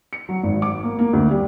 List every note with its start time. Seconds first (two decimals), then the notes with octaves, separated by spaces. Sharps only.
0.13 C#7
0.29 F#3
0.43 G#1
0.62 D6
0.83 A#3
0.99 A#3
1.13 D2
1.31 G3